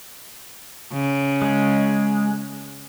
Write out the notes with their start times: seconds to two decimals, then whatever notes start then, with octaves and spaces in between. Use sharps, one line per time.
0.92 C#3
1.42 G#3